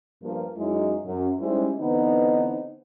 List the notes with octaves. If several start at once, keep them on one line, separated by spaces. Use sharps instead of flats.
G2 F3 A#3
F#2 F#3 G#3 D#4 E4
F#2
G3 G#3 C#4 D#4 E4 C5
D3 E3 B3 C4 D#4